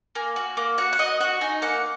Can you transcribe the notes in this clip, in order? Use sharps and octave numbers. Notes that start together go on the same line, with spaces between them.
A#3 G#5
F#4
A#3
F#4 F#5
F#5
F#4 D#5
F#4 F#5
D#4 G#5
A#3 F#5